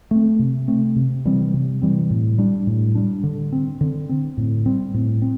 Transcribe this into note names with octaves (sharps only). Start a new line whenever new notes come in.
A3 C4
C3
A3 C4
C3
E3 G3 C4
C3
E3 G3 C4
A2
G3 D4
A2
G3 D4
D3
C4
D3
C4
A2
G3 C4
A2
C4